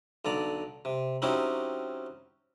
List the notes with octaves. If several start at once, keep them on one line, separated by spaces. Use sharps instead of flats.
B1 D3 D5 A#5
C3
F#3 C4 C#4 D#4 E4 G4